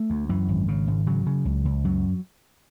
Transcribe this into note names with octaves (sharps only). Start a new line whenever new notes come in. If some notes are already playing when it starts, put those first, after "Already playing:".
Already playing: A3
D2
F#2 E3
G#1
C#3
G#1
C#3 F#3
C#3
C#2
C#2
F#2 F#3